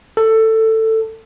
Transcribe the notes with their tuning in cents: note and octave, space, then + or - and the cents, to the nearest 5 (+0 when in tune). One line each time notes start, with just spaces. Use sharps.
A4 +15